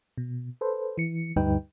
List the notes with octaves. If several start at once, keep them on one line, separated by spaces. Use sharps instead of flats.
B2
A4 B4 C5
E3 C#7
D2 G2 G3 D#4 B4 G5